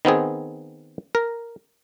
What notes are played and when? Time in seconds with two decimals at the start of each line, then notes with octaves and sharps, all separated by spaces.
0.05 D#3 B3 C4 G#4
1.15 A#4